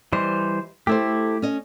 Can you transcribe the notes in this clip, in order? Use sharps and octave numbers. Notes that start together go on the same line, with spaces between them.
E3 G3 C5 D#5
A3 E4 G4 A4 C5
C#4 D#5